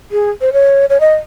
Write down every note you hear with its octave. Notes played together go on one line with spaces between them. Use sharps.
G#4
C5
C#5
C#5
D#5